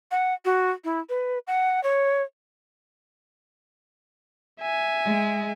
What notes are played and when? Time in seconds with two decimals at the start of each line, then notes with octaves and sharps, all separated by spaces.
0.11 F#5
0.45 F#4
0.84 E4
1.09 B4
1.47 F#5
1.83 C#5
4.61 E5 G#5
5.05 G#3